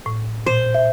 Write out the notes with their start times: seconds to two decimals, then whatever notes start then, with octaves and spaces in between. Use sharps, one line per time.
0.06 A2
0.46 A#2 C5
0.75 E5